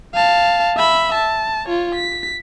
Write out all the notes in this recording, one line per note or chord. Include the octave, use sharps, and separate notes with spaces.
F5 A5
E5 B5
A5
F4 C#5
B6